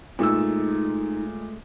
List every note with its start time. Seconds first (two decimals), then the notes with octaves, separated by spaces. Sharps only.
0.19 A#2 G#3 A3 D#4 E6